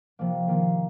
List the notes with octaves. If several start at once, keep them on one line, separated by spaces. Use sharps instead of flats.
C3 F3 A#3
D#3 A#3 F4